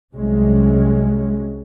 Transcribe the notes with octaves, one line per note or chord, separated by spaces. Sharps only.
C2 C3 F#3 G#3 C#4